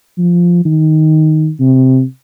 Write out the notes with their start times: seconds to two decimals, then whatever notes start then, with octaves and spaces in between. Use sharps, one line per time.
0.18 F3
0.65 D#3
1.60 C3